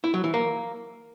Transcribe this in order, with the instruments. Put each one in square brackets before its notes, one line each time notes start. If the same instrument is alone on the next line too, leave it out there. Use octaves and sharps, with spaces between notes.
[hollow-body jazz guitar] E4
F#3
E3
A#3